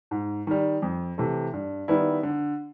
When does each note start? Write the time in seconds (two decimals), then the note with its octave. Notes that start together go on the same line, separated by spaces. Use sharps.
0.11 G#2
0.47 D#3 G3
0.82 F2
1.18 C3 E3 A3
1.53 G2
1.88 D#3 G3 B3 E4
2.23 D3